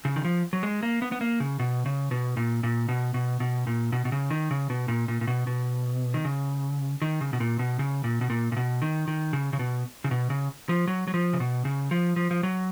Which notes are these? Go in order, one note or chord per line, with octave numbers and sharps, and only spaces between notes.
C#3
D#3
F3
F#3
G#3
A#3
B3
B3
A#3
C#3
B2
C#3
B2
A#2
A#2
B2
B2
B2
A#2
B2
B2
C#3
D#3
C#3
B2
A#2
A#2
A#2
B2
B2
D#3
C#3
D#3
C#3
B2
A#2
B2
C#3
A#2
B2
A#2
A#2
B2
D#3
D#3
C#3
C#3
B2
C#3
B2
C#3
F3
F#3
F#3
F3
C#3
B2
C#3
F3
F3
F3
F#3